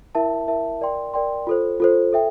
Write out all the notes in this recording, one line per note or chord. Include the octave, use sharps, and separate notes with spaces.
E4 A#4 E5 A5
E4 A#4 E5 A5
A#4 D5 G5 C6
A#4 D5 G5 C6
F4 A4 C5
F4 A4 C5
A4 E5 G5